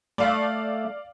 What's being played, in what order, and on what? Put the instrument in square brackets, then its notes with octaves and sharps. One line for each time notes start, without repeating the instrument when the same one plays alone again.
[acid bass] A3 [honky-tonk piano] D5 F5